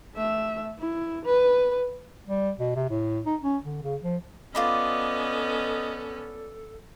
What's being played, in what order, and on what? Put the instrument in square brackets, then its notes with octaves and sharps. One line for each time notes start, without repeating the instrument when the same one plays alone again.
[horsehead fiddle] A3 E5
E4
B4
[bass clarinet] G3
B2
C3
A2
D#4
C#4
D3
C#3
F3
[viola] B3 C#4 [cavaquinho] F4 D5 B5 [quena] A4 [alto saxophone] D#5